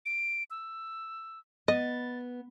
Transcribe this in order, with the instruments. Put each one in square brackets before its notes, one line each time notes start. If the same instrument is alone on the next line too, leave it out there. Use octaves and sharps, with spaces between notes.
[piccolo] D7
E6
[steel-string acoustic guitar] B3 [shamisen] D#5 [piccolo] A6